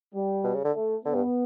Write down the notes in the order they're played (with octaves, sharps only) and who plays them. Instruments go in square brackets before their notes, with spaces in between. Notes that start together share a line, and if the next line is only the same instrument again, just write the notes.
[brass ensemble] G3
[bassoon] B2
C#3
D3
[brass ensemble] A3
[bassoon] D3 [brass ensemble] B3
[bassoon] G2